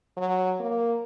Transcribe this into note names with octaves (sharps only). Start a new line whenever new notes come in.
F#3
A#3